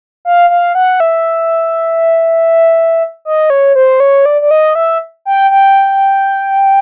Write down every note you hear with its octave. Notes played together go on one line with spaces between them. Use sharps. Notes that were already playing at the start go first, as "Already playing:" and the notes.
F5
F5
F#5
E5
D#5
C#5
C5
C#5
D5
D5
D#5
E5
G5
G5